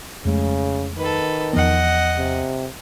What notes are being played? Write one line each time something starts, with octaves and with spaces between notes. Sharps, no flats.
F2 C#3 G#3 A3
D#3 A4 B4
E2 F3 B3 D#5 F#5
C3